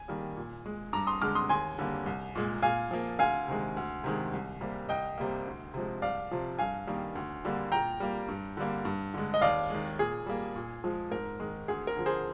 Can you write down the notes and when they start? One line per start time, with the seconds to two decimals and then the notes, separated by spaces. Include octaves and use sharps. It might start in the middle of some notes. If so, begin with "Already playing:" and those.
Already playing: G#5
0.08 D#3 G3 A#3
0.37 A#2
0.66 G#3
0.93 G2 A#5 D6
1.07 C6 D#6
1.21 D3 G#3 D6 F6
1.35 C6 D#6
1.49 D#2 G#5 C6
1.78 D3 G3 A#3
2.06 C2
2.35 A#2 G#3
2.63 A#2 F5 G#5
2.91 F3 A#3
3.19 D2 F5 G#5
3.48 C3 D#3 G#3
3.77 D2
4.04 C3 D#3 G#3
4.33 C2
4.61 C3 G3 A#3
4.89 C2 D#5 G5
5.18 C3 G3 A#3
5.47 D2
5.74 C3 F3 G#3
6.02 C2 D5 F5
6.31 C3 F3
6.59 G2 F5 G#5
6.87 D#3 G3 A#3
7.15 D2
7.45 D3 G3 A#3
7.72 A#2 G5 A#5
8.00 G3 A#3
8.28 G2
8.57 D3 G3 A#3
8.85 G2
9.14 D3 G#3
9.34 D#5
9.41 D#2 D5 F5
9.70 D#3 G#3
9.99 A#2 G#4
10.26 G3 A#3
10.56 A#2
10.84 F3 G#3
11.11 G#2 A#4
11.40 D#3 G#3
11.68 D2 G#4
11.87 A#4
11.97 D3 F3
12.06 G#4 C5